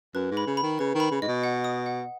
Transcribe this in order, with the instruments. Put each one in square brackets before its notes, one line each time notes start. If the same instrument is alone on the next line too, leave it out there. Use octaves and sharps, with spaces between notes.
[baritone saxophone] F#2 [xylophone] B4
[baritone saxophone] G#2
[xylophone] B5
[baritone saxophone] C#3
[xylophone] B5
[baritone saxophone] D#3
[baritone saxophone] C#3 [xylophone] B4
[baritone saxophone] D#3 [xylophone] B5
[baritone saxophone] C#3
[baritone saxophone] G#2 [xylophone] D#5
[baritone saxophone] B2
[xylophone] F#5
D#6
F#5